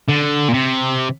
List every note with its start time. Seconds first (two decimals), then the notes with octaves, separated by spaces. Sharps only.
0.09 D3
0.48 A#2
0.54 C3